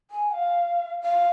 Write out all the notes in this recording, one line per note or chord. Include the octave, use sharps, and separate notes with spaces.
G#5
F5
F5